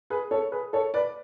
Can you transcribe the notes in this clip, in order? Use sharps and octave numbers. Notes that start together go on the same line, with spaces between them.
G#4 B4
A4 C#5
G#4 B4
A4 C#5
B4 D5